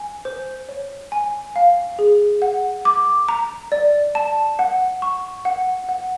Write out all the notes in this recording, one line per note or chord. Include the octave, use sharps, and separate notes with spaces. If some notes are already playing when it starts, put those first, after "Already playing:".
Already playing: G#5
C5
C#5
G#5
F5
G#4
F#5
D6
A#5
D5
A5
F#5
C#6
F#5
F#5